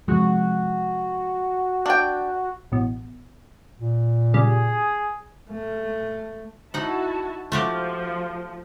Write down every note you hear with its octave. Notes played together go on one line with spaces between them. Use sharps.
C3 F3 G#3 F#4
D4 G5
A1 B2
A#2
C#3 G3 G#4
A3
D#4 E4 F#4 F#5 A5
F3 A3 F#4 G4